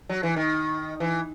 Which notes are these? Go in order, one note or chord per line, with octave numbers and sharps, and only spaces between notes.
F#3
E3
D#3
E3